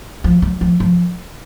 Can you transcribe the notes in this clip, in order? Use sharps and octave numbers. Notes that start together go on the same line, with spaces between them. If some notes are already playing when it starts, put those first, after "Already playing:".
F3
F#3
F3
F3